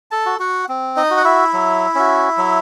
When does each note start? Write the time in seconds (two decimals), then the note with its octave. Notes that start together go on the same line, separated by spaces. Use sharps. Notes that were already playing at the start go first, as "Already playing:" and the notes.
0.11 A4 A5
0.26 F#4
0.39 F#4 F#5
0.68 C4
0.96 D#4 D#5
1.11 F#4
1.17 F#5
1.25 E4 E5
1.53 F#3
1.95 C#4 F#4
2.37 F#3